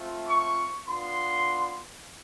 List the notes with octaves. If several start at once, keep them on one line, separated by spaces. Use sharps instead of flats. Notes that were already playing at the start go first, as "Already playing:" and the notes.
Already playing: A3 C4 F4
C#6
B3 D4 F4 C6